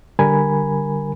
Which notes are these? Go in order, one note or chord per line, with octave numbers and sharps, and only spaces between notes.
D3 G3 A#4 G#5 B5